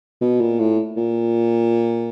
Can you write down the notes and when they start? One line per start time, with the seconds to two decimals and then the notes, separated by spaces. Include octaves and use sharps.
0.21 B2
0.40 A#2
0.59 A2
0.97 A#2